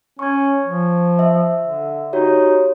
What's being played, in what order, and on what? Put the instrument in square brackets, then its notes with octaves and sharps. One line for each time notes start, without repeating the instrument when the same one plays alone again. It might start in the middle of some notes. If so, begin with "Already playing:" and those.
[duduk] C#4 [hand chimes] C#6 G#6
[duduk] F3
[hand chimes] E5
[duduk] D3
[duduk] D#4 [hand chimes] F#4 G4 C#5